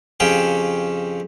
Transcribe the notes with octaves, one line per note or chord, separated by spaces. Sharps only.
F2 C#3 C#4 G4 G5